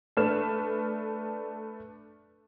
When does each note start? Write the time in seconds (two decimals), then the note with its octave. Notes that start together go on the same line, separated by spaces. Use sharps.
0.17 A3 D4 B4 F6 E7